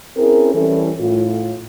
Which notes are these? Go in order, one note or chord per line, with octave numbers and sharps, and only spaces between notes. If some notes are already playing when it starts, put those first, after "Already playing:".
C4 C#4 E4 G#4 A#4
E3 G3 C#4 E4 A4
A2 F4